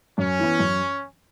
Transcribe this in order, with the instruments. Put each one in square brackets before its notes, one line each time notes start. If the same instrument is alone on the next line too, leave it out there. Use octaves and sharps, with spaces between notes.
[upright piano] F#2 [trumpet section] C#4
[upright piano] E3 B3
F#2